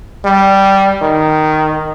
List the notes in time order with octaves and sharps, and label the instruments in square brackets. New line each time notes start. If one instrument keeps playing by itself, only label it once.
[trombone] G3
D#3